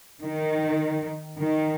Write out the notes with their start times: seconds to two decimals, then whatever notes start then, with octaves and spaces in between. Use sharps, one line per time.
0.23 D#3
1.40 D#3